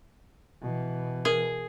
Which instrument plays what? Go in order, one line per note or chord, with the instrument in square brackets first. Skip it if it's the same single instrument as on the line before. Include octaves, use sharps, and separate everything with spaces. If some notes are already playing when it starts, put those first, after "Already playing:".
[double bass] B2 E3
[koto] G#4 [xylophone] A#4